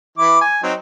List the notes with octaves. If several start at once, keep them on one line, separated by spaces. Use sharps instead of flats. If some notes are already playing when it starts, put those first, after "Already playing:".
E3 E4 D6
G#5
F#3 C4 D#4